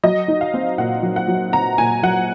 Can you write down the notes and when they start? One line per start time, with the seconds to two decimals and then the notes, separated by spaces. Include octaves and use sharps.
0.03 F#3 D#5
0.28 D#4
0.41 F5
0.54 C4
0.78 A#2 F#5
1.03 F#3
1.16 F#5
1.28 F#3
1.53 C4 A#5
1.78 A#2 G#5
2.03 F#3 F#5